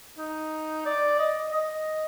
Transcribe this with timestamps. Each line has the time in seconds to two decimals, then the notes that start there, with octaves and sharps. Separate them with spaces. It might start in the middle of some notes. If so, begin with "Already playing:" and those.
0.18 D#4
0.85 D5
1.19 D#5
1.53 D#5